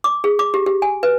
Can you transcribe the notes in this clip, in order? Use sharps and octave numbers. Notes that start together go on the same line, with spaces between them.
D6
G#4
D6
G4
G4
G#5
B4